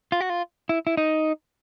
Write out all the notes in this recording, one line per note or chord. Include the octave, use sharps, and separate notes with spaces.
F4
F#4
F4
E4
E4
D#4